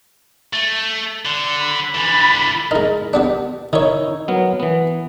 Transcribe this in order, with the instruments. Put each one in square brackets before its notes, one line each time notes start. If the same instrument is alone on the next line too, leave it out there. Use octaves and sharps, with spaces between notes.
[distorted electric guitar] A3
D3
[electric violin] B5
[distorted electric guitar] D3 E3 [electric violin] B5 A6
[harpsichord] G#3 D#4 [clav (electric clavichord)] A#4
[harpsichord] G3 B3 D4
[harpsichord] D#3 C#5 [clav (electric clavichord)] D#4 E4
[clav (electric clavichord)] F#3 B3 A#4
E3 B3